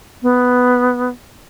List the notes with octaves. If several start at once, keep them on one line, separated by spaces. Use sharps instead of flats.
B3